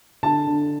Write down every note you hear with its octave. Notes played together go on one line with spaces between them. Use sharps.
D3 A5
D3